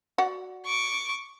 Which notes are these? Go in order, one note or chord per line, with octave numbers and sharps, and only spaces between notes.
F#4 D5 F#5
C#6 D6